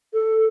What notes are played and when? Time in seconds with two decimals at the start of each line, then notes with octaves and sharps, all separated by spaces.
0.13 A4